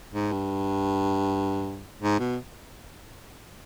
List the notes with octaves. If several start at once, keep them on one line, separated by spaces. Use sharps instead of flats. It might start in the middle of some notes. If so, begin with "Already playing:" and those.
G#2
G2
G#2
B2